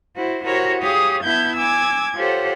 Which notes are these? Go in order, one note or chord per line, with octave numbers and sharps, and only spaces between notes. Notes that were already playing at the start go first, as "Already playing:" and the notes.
E4 F#4 C5
E4 F#4 G4 A#4 C5 C#5
G4 G#4 C#5 F5 D#6
B3 E4 E5 A5 G6 G#6
G#5 D6 E6 G#6
F4 G4 A4 C5 C#5 F#5